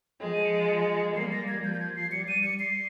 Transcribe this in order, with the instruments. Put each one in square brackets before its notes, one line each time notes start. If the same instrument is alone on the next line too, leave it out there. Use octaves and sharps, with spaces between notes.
[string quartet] F3 G#3
[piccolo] D#7
C#7
D#7
C#7
[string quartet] G3 A#3 [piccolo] C7
[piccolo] A#6
G#6
[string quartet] F3 [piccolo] G6
[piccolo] G6
G#6
C7
[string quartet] G3 [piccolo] C#7
[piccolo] D#7
C#7
C7